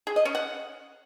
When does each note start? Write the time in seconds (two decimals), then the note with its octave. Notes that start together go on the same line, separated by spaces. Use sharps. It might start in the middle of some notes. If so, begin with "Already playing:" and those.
0.07 G#4
0.16 D#5
0.25 C#4
0.35 F#5